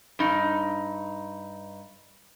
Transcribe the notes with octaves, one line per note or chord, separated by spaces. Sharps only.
G2 D#4